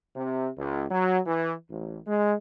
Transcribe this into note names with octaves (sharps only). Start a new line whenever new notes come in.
C3
C#2
F#3
E3
A1
G#3